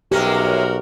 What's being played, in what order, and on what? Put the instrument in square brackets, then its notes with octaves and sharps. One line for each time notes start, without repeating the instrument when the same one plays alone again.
[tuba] B1 [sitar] C3 G#3 C#4 [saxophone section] F#4 A#4 [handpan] G4